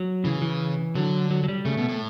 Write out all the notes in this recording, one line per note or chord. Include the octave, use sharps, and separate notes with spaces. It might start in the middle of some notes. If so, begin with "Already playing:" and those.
Already playing: F#3
C#3 E3
E3
D3 F#3
F#3
F#3
G3
C#3 A3
B2
A2